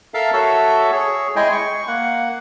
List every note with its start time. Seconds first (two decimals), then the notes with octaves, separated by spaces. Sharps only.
0.14 A4 A#4 E5 F5 A5
0.33 F#4 A4 C#5 E5
0.92 G#4 C#5
1.36 G#3 E4 G#4 D#5 G5 G#5
1.52 C#6
1.87 A#3 F#5